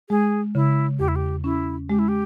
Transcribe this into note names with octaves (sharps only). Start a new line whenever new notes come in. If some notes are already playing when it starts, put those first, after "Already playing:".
G#3 G#4
C#3 E4
E2 G4
E4
G4
C#4 E4
G#3 G4
E4
G4